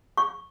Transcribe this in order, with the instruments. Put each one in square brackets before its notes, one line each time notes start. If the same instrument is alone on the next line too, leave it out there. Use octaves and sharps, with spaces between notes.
[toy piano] C#6